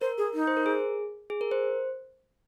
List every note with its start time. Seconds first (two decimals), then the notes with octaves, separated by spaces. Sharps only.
0.01 A#4 C5
0.18 G#4
0.34 D#4
0.47 C5
0.57 A#4
0.66 G#4
1.30 G#4
1.41 A#4
1.51 C5